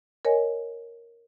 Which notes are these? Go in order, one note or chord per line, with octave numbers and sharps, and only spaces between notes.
A#4 C#5 D#5 G#5